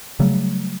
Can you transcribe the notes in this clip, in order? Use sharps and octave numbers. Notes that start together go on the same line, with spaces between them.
C#3 F#3 G3 A3